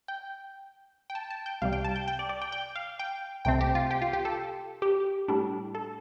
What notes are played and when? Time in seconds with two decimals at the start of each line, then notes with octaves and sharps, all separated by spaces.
0.08 G5
1.10 G5
1.15 A5
1.30 A5
1.46 G5
1.61 C2 C3 G3 F5
1.73 G5
1.84 A5
1.96 G5
2.08 G5
2.19 D5
2.29 D5
2.42 G5
2.52 G5
2.76 F5
2.99 G5
3.45 C2 C3 A3 C4 G5
3.61 G4
3.75 F4
3.91 G4
4.02 F4
4.13 G4
4.25 A4
4.82 G4
5.28 A2 G3 D4
5.75 A4